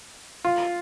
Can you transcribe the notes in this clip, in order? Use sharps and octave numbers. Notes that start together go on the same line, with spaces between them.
F4